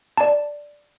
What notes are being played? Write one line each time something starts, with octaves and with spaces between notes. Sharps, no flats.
D5 A5